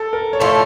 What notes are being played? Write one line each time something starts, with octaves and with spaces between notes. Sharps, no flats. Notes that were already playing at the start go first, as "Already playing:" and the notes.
Already playing: A4
A#4
C#5
A2 F3 A3 C5